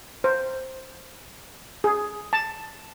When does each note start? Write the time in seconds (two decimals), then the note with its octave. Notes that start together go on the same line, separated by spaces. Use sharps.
0.24 C5
1.84 G#4
2.33 A5